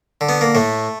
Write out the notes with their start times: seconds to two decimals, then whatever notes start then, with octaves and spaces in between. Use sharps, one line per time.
0.21 D3
0.29 B3
0.41 A#3
0.55 A2 A3